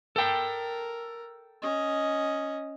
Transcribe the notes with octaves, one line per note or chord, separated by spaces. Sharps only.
A4 A#4 G5
C#4 D#5